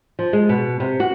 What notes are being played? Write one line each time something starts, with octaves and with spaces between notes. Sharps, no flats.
F3
G#3
B2
C3
F#4